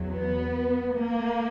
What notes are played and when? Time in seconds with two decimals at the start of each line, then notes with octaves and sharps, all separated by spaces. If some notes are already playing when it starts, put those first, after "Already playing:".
Already playing: E2 F#3
0.08 B3
0.95 A#3